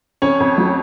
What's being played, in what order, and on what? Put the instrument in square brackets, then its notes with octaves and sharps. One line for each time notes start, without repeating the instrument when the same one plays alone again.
[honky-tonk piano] F2 [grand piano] C#4 C#5
[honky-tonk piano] F2
F#3